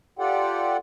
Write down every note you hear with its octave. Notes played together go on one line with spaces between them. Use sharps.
F4 G4 A4 D5 F#5 G5